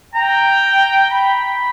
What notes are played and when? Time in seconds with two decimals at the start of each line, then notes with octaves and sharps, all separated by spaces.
0.15 G5 A#5
1.11 B5